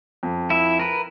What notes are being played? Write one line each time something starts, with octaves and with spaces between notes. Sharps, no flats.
F2
E4 E5
A#4 B4